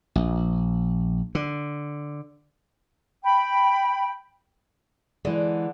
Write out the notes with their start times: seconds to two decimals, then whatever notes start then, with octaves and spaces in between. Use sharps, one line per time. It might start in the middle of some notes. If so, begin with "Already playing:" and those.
0.15 A#1
1.35 D3
3.23 G5 B5
5.25 D3 E3 G#3